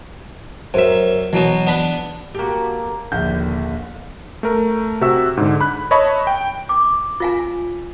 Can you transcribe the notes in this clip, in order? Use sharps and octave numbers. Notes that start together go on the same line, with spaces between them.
F#2 A#4 C5 E5
B2 E3 F#3 B3
B3 D4 B5
A#3 F#4 G4 A4
A#1 D#2 D3 G6
A3 A#4
C3 F#4 E5 E6
G#2 D3
B5 F#6
C#5 D#5 E5 A5 B5 C#6
G5
D6
F4 F5 G#5